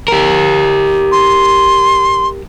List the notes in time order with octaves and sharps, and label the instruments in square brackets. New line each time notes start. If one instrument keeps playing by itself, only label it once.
[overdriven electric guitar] G4 A#4
[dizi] C6